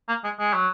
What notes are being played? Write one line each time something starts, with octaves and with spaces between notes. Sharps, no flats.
A#3
G#3
G#3
F#3